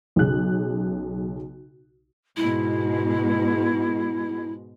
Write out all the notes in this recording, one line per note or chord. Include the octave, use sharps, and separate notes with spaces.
B1 C#3 F#6
G#2 B2 G#3 E4